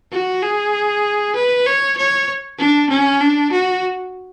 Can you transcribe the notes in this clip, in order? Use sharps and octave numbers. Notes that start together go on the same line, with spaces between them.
F#4
G#4
B4
C#5
C#5
D4
C#4
D4
F#4